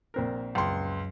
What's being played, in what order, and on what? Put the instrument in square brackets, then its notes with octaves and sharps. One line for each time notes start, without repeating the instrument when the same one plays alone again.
[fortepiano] A#1 C4 A#4
[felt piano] C#2 C6 [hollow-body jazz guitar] F#2